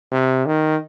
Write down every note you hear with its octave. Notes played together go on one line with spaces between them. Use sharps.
C3
D#3